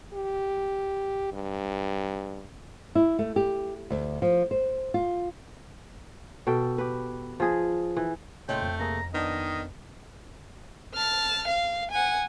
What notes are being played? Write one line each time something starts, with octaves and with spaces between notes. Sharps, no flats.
G4
G2
E4
A3
G4
D2
F3
C5
F4
B2 A4 E5 G5
G4 B4
F3 G#4 D#5
E3
A#2 C#3 A3 C#5 D#5 G5 C6
F2
C3 A#3 G#4 A#5
D#3 B3 D4 D#5
A5 F6
F5
F#5 G#5